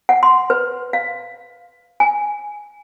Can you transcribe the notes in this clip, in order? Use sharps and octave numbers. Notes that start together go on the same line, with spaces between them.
F#5
C6
B4
F5
G#5